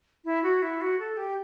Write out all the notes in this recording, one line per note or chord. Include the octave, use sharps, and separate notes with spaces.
E4
F#4
E4
F#4
A4
G4